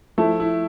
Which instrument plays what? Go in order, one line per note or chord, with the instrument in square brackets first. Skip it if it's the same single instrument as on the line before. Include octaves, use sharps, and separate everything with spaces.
[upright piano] F3 A3 [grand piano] E4
[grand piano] E4